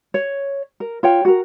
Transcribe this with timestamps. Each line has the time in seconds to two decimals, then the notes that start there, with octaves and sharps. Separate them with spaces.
0.14 C#5
0.80 A#4
1.03 F4 C#5 G5
1.25 F#4 A#4